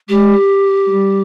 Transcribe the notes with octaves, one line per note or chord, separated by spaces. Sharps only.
G#3 G4
G#3
G3